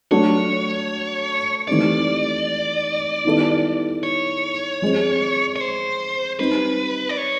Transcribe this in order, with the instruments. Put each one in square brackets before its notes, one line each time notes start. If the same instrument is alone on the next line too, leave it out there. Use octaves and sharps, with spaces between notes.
[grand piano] F#3 A3 D4 F#4 A4 [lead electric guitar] C#5
[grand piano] E3 A3 C4 D#4 G4 [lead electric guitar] D5
[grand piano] D#3 G3 B3 E4 A4
[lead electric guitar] C#5
[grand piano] F3 G#3 C4
[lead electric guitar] C#5
C5
[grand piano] G3 C4 D#4 G4 [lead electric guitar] B4
[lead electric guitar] D5
C#5